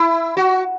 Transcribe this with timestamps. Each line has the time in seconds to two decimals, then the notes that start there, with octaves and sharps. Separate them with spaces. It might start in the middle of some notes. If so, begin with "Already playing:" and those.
Already playing: E4
0.37 F#4